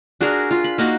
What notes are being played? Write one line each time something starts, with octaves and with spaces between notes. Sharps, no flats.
D4 F#4 G#4 A#4
F4
B5
A#3 D#4 F#4 B5